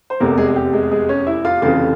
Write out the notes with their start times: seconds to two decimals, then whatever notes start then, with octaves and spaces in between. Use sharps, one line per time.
0.10 C5
0.20 F1 E2 C3 A#3 A#4
0.38 G#3 G#4
0.48 G#4
0.56 G4
0.73 G#3 G#4
0.91 G#3 G#4
1.09 C#4 C#5
1.27 E4 E5
1.45 F4 F5
1.62 F1 F2 C#3 E3 F4 F5